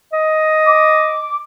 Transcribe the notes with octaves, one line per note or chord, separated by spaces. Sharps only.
D#5
D6